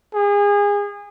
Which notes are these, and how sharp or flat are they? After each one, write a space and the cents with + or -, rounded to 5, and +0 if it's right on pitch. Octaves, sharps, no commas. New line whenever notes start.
G#4 -30